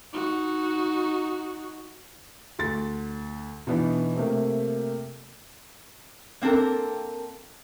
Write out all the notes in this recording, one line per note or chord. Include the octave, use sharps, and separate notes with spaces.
D#4 F#4
D2 C6 A6
B2 E3 B3 D4 D#4
C3 A3 A#3
A#3 C4 D4 A4 A#4